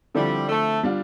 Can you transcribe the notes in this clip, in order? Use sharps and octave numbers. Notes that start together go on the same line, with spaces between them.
D3 F3 G3 C4 E4 A4
A3
G3 D4 F4